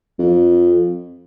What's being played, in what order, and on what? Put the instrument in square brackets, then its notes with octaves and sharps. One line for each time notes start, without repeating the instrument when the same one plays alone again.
[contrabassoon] F2